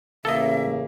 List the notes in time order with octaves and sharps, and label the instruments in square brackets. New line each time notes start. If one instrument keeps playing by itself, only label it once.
[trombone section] A1 C#3 [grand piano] A#3 [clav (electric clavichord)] A4 D#5 [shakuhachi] E5